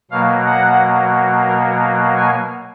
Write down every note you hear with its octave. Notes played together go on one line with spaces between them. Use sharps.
B2 F#3 A#3 F5
F#5
A#4
G#5